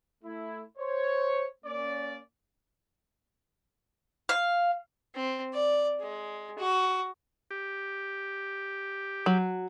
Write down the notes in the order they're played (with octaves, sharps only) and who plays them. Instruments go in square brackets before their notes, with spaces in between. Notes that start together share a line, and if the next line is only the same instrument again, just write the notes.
[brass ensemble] A3 E4
C5 C#5
A#3 C#4 D5
[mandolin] F5
[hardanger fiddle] C4
D5
G#3
F#4
[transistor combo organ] G4
[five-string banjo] F#3